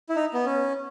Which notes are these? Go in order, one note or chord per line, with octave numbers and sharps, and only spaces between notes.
E4
D#4
B3
C#4